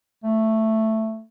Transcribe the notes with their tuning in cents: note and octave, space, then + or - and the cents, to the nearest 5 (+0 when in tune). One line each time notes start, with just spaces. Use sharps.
A3 +5